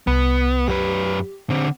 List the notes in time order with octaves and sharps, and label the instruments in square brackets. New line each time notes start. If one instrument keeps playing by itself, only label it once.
[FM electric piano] C2 [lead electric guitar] B3
[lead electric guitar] F#2 B4 [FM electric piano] G4
[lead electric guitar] D3 C4